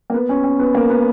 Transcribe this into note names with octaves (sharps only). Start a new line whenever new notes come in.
A#3
B3
C#4
C#4
B3
A#3
B3